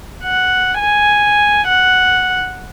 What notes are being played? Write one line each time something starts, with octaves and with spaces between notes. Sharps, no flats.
F#5
G#5
F#5